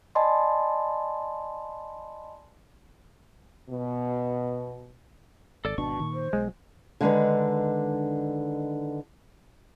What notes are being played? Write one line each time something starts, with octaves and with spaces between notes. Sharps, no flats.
D5 D#5 G#5 A5 B5 C6
B2
G#1 A4 D5
G#1 B2 D4 A5 C#6
A#2 D#3
C5
B1 G#3
D3 D#3 G#3 D4 B4